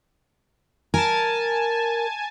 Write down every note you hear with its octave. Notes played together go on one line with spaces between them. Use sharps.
A#4 G#5 A5